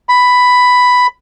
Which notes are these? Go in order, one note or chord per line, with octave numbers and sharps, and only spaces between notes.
B5